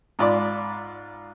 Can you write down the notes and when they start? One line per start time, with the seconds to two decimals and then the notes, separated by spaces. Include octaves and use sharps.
0.19 G#2 F4 D5 B5 D6